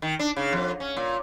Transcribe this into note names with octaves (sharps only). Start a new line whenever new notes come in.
D#3
D4
C#3
F2
C#4
A#2